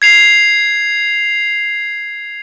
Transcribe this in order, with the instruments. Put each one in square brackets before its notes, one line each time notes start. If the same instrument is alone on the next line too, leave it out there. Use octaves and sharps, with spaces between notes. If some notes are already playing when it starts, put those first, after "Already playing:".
[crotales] G#6 C7 F7